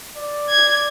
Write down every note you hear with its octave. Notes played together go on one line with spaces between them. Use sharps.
D5
G#6